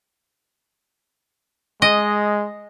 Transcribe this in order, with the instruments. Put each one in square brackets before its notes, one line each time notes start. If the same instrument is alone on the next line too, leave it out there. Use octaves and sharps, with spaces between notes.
[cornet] G#3 [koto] D#5